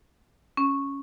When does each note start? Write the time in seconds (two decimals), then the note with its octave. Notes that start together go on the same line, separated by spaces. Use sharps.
0.57 C#4